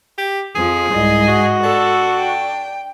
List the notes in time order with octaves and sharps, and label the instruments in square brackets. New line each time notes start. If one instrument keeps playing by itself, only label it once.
[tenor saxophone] G4
[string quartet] F2 F3 [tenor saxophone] G#4
[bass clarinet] C2 [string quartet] G#2 D#5
[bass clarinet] F#4
[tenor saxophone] D4 [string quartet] A4
[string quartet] G5